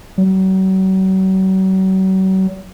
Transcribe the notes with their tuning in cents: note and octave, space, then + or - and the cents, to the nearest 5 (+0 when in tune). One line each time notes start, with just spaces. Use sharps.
F#3 +40